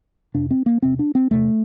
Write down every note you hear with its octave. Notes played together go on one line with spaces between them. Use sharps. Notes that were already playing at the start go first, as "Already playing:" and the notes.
F2 C3 D4
C4
A#3
E2 C3 C4
D4
C4
E2 C3 A3